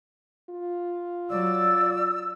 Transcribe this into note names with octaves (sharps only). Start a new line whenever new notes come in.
F4
F#3 D5 E6